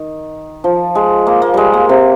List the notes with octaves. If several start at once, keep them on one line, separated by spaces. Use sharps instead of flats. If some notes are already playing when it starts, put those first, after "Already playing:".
Already playing: D#3
F3
G#3
A#3
A#3
G3 G#3
A#3
C3